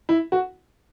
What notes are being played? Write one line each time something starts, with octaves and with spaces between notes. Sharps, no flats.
E4
F#4